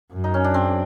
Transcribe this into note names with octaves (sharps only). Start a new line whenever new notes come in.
F#2
D#4
C#4
D4
C4